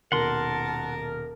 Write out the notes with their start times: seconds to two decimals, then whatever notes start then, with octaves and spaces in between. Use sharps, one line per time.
0.12 D#1 B2 D#4 A#4 F#5 A5 C6